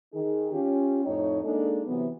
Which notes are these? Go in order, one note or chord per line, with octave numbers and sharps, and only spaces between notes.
D#3 D#4 G#4
C#4 F4 G4
F2 A2 A3 D#4 C#5
G#3 A#3 D4 D#4 G#4 A4
C3 E3 F#3 B3